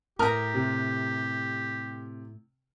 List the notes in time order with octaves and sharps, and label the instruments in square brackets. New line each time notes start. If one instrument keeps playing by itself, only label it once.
[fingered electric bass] A2 [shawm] G4 [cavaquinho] A#4 A#5 [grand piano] D#6 F6
[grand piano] C3